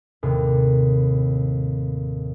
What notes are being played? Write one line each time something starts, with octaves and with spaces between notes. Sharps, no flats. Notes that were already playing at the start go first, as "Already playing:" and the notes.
D#2 A2 C3